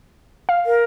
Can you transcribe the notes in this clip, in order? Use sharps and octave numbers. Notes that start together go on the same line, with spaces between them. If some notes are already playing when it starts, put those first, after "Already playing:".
F5
A#4